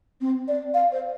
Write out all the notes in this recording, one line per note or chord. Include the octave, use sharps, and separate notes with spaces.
C4
D5
F5
C5